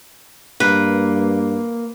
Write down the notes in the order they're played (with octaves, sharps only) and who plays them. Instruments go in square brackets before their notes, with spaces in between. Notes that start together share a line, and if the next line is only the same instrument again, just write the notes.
[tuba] G2 [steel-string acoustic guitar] A#3 [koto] B4